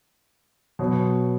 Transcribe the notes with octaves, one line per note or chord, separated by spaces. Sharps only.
B2 F#3 B3